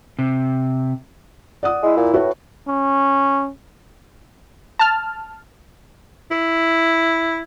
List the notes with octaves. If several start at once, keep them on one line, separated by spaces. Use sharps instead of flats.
C3
D5 F#5 D#6
G#3 E4
A#2
A2 F#4 B4 C#5
C#4
A5 F6
E4